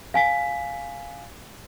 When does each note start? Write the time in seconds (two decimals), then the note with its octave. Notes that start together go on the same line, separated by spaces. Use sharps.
0.14 F5 G#5 B6